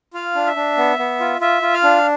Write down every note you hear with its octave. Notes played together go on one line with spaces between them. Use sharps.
F4 F5
D4
E5
D4
B3
B3
F4
F4 E5
F4
F5
D4